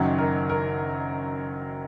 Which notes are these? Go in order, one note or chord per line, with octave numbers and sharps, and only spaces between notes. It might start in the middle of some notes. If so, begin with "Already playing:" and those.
Already playing: F#1 F#2 D#3 F#3
A#4
A#4